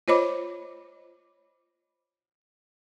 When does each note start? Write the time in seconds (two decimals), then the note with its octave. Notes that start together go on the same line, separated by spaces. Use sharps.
0.08 F4 C5 C#5 D#5 B5 D6